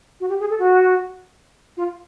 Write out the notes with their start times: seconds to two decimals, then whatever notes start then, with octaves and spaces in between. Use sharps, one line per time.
0.20 F#4
0.29 G4
0.40 G#4
0.50 A4
0.59 F#4
1.77 F4